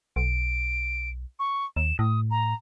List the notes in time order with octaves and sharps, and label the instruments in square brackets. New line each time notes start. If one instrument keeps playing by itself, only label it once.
[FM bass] B1 [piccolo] D7
[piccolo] C#6
[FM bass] D#2 [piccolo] E7
[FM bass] A2 [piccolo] D#6
[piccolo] A#5